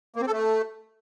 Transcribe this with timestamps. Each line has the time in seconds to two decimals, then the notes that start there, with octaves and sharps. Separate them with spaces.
0.16 A#3
0.21 C4
0.27 A4
0.33 A3